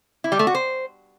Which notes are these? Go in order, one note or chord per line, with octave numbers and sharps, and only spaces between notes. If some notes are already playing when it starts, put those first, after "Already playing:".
E4
G3
A3
F#4
C5